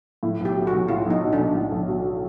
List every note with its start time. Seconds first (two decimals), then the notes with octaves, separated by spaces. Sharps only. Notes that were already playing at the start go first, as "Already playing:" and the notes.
0.23 A2
0.40 B1
0.45 G4
0.56 F#3
0.67 F#4
0.72 B1
0.88 A2 F4
1.06 B1 D#4
1.23 F#3
1.33 D4
1.39 B1
1.55 A2
1.72 B1
1.88 F#3